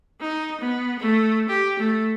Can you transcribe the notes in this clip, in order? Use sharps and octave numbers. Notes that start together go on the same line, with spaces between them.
D#4
B3
A3
G4
A3